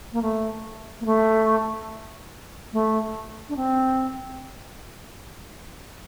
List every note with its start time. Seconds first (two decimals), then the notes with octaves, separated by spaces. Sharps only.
0.13 A#3
0.22 A3
1.01 A#3
1.05 A3
2.73 A3
3.49 D4
3.56 C4